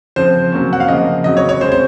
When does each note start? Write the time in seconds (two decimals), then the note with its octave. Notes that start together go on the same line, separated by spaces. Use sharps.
0.16 C#3 F3 C4 C5
0.52 C3 F#3 A#3 C#4
0.73 F#5
0.80 F5
0.88 C#3 F3 A#3 D#5
1.24 C#3 F#3 C4 D#5
1.37 C#5
1.49 C#5
1.61 C#3 G#3 C4 C5
1.72 C5